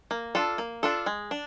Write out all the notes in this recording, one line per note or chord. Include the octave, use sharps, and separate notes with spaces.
A#3
D4 F4 A4
A#3
D4 F4 A4
G#3
D4